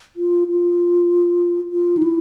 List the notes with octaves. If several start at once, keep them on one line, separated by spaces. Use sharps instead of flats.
F4
F4
F4
D#4
E4